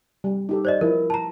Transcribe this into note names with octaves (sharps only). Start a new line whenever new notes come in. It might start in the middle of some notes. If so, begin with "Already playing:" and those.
G3
D#4 G4 A4
C5 D5 D#5
F3 E4 A#4
A5 A#5